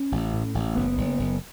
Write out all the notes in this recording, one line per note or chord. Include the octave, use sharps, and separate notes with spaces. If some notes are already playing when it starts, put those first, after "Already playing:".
Already playing: C#4
A1
A2
A1
F#1 B3
F#1
F#1